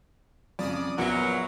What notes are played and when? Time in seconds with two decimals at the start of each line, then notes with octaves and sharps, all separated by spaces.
0.59 F2 C#3 D5 D#6
0.98 A#1 A#2 F#3 B3 A#4 B4 E5